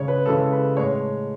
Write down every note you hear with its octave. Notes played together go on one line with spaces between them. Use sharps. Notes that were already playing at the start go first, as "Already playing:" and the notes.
Already playing: C#3 G#3 C#5
B4
C#3 E3 G#3 A4
B4
A2 G#3 C#5